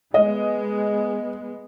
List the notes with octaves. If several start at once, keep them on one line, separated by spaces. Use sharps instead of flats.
G#3 B3 D#5